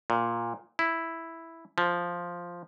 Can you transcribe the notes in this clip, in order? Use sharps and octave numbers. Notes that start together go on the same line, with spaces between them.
A#2
E4
F3